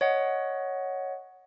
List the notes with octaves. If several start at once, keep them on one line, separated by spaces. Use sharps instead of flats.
C#5 D#5 F#5